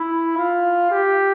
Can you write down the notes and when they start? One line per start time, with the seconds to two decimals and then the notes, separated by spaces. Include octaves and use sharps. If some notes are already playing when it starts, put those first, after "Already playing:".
Already playing: E4
0.38 F4
0.91 G4